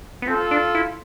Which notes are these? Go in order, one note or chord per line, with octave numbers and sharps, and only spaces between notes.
B3
C4 F4 A4
D4
E4